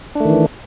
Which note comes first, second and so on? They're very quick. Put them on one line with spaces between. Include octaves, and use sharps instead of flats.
D4 A3 D#3 E3